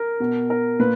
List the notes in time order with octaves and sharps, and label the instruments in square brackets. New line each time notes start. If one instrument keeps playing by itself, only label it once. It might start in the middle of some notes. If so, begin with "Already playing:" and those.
Already playing: [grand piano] A#4
B2
A#4
A#2 B4